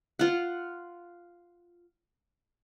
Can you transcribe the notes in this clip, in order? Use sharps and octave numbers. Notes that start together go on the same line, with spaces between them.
F4 F#5